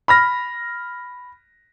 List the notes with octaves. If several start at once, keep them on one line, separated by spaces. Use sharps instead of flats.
B5 F6 A#6